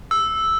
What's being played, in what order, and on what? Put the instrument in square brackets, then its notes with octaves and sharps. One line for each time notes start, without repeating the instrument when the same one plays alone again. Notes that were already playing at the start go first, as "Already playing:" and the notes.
[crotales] E6